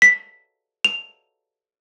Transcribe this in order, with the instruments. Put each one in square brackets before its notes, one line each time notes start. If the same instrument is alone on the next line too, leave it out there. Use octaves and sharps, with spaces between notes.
[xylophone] B6
F7